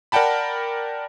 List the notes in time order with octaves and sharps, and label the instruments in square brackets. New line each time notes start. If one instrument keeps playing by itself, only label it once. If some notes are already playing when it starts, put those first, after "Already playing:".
[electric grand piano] A#4 D5 F#5 G5 A5 B5